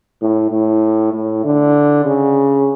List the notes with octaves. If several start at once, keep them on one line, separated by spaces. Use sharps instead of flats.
A2
A2
A2
D3
C#3